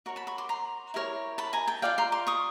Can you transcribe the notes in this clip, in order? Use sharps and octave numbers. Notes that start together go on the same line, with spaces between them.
F#4 A#4 C#5 C#6
A5 B5
B5 C#6
C6 D6
A#5 C6
E4 G4 A#4 C#5
A5 B5
G#5 A#5
G5 A5
F4 A4 D5 F5 G5
A#5 C6
C6 D6
C#6 D#6